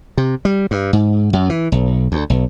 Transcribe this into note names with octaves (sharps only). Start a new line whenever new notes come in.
C3
G3
G2
G#2
F#2
E3
B1
D2
B1